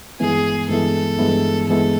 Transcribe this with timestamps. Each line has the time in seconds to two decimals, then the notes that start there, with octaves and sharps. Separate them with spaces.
0.20 G2 E3 G#3 B3 E4 G#4
0.69 G2 E3 G#3 B3 E4 A4
1.18 G2 E3 G#3 B3 E4
1.67 G2 E3 G#3 B3 E4 A4